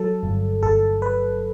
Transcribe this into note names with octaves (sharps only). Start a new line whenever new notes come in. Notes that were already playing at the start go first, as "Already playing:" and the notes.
Already playing: F#3 A4
G1
G1 A4
B4